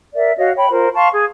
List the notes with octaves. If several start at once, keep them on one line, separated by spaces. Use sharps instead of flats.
A#4 D5 E5
F#4 C#5 D#5 F5
C#5 G5 B5
F4 A#4 C5
F5 A5 C6 C#6
G#4